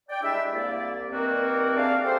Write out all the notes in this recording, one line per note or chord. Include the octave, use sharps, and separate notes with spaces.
D5 G5
G3 G#3 D4 E4 E5
C2 A#3 D5
G2 D#3 A#3 C4 F#4 A#4
D4 G#4 D5 E5 F5
G4 A4 C5